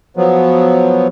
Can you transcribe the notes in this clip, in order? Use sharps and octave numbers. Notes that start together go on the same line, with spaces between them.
F3 F#3 B3